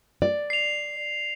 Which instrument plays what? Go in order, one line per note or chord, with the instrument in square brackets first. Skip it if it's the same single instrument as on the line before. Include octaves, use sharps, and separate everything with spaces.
[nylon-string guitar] D5
[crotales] C7 F7